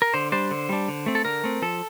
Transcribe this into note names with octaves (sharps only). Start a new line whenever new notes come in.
A#4
D3 C5
G3 D4 C5
D3
G3 D4
D3
A3 C4
A4
D3 A#4
A3 C4
F3 A4